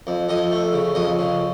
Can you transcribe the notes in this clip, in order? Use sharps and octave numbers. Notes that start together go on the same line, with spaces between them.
F2
F2 D#5
A3
C#3
F2 D#5
C#3